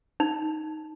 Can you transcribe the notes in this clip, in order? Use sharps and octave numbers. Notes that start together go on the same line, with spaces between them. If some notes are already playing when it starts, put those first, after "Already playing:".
D#4